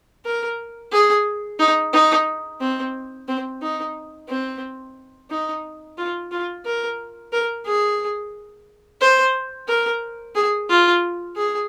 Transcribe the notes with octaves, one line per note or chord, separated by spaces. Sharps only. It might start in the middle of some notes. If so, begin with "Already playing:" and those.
A#4
G#4
D#4
D#4
C4
C4
D#4
C4
D#4
F4
F4
A#4
A#4
G#4
C5
A#4
G#4
F4
G#4